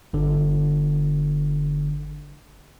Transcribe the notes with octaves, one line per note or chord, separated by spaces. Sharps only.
G1 D3